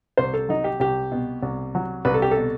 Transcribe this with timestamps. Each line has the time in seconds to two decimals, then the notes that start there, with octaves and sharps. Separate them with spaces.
0.18 C2 C5
0.34 A4
0.49 F#3 D#4
0.64 G4
0.80 C2 G4
1.12 B2
1.43 C2
1.75 F#3
2.05 C2 B4
2.14 A4
2.22 G4
2.31 A4
2.37 B2